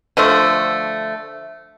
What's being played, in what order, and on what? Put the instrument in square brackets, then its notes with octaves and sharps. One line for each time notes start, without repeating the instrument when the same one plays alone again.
[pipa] D3 F3 A3